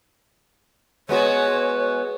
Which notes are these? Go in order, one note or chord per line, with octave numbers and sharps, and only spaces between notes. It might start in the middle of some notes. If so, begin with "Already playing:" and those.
G#3 B3 F#4 C#5